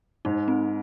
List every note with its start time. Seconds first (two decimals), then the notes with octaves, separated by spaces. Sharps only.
0.25 G#2 D#4
0.48 C4